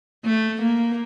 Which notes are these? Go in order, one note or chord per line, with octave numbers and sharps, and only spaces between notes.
A3
A#3